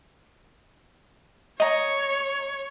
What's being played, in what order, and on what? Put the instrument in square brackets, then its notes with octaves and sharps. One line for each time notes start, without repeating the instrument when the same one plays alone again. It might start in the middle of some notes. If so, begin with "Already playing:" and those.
[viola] C#5 [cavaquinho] D#5 A#5